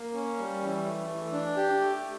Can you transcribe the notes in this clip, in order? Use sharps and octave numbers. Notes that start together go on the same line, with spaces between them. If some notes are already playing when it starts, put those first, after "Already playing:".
Already playing: A#3
C#4
G3
E3
A3
E3
D4
G4
A3